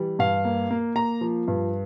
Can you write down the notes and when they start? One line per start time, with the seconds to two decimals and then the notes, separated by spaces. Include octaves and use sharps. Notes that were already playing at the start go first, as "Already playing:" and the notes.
Already playing: E3 G3
0.19 G2 F5
0.45 A#3
0.71 A#3
0.95 A#3 A#5
1.21 F3
1.48 G2